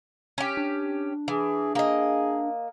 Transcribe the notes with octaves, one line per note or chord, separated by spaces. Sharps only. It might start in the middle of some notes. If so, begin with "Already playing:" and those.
C#4 G4
D4
E3 G#4
A#3 G#4 D#5